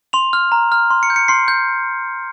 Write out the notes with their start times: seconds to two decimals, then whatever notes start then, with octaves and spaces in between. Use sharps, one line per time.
0.13 C6 F7
0.33 F6
0.52 A#5
0.72 F6
0.90 C6
1.03 C#7
1.10 G6
1.16 C#7
1.28 C6 C7
1.48 G6